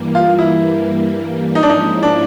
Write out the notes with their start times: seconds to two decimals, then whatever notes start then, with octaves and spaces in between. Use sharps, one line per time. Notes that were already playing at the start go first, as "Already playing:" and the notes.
Already playing: G2 E3 G3 A#3
0.15 F4
0.39 E4
1.55 G#2 F3 A#3 C#4 D#4 E4
1.63 D4
1.70 D#4
2.03 D4